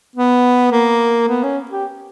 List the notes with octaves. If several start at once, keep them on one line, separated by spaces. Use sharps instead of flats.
B3
A#3
B3
C#4
G4